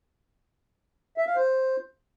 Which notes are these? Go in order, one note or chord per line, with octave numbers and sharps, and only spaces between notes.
E5
F5
C5